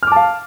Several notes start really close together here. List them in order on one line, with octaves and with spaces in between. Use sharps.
F6 D6 A5 F5